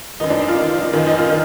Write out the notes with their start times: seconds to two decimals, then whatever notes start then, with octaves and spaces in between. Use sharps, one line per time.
0.20 F#2 D#3 D#4
0.30 D4
0.39 D#4
0.48 F4
0.57 F#2 D#3 D#4
0.70 F4
0.82 D#4
0.93 F#2 D#3 F4
1.06 D#4
1.18 F4
1.30 D#3